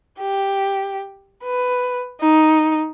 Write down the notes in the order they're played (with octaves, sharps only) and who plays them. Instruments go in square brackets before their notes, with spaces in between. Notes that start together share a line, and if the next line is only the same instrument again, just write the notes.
[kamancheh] G4
B4
D#4